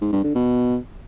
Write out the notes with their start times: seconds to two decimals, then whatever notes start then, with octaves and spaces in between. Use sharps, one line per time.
0.01 G#2
0.12 G2
0.24 D3
0.35 B2